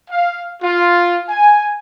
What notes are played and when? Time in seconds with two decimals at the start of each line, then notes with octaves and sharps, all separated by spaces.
0.10 F5
0.62 F4
1.29 G#5